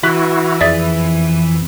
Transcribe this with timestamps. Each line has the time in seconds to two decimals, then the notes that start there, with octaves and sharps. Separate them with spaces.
0.03 E3 E4 F#4 B4
0.61 F2 G#4 D5 E5